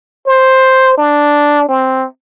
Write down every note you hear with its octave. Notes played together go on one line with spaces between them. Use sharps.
C5
D4
C4